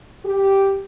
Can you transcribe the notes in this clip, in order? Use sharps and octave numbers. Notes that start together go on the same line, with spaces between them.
G4